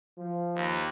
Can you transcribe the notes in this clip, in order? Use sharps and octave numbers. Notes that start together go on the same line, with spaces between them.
F3
D#2